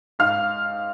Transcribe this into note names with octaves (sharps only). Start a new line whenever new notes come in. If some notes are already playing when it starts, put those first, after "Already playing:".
G#2 F5 F6